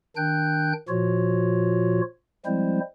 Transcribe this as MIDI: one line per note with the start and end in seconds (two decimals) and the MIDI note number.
0.16 0.73 51
0.16 0.73 62
0.16 0.73 79
0.16 0.73 90
0.16 0.73 91
0.89 2.01 46
0.89 2.01 53
0.89 2.01 65
0.89 2.01 66
0.89 2.01 73
2.46 2.80 53
2.46 2.80 55
2.46 2.80 56
2.46 2.80 60
2.46 2.80 64
2.46 2.80 72